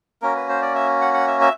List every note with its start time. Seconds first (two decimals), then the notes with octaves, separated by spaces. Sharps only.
0.22 A#3 C#4 F#4 A#4
0.35 B4
0.49 C5
0.62 D5
0.75 E5
1.01 F#5
1.14 F#5
1.27 E5
1.41 E5